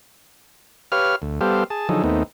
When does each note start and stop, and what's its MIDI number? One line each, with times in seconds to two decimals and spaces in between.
0.92 1.16 67
0.92 1.16 71
0.92 1.16 73
0.92 1.16 77
0.92 1.16 89
1.22 1.39 38
1.41 1.64 55
1.41 1.64 59
1.41 1.64 67
1.41 1.64 69
1.41 1.64 72
1.41 1.64 77
1.70 1.89 68
1.70 1.89 81
1.89 2.03 50
1.89 2.03 53
1.89 2.03 54
1.89 2.03 63
1.89 2.03 68
1.89 2.03 69
2.04 2.23 39
2.04 2.23 57
2.04 2.23 59
2.04 2.23 60
2.04 2.23 63